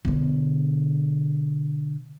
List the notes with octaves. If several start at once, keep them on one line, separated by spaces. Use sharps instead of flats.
B2 D3